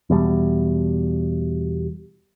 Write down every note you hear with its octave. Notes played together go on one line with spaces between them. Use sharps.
E2 B2 G3